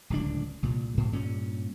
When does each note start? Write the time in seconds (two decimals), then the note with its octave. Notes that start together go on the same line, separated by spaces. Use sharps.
0.10 D1 C#2 D4
0.63 C2 A#2
0.97 G#2
1.13 G2 A#2 C#4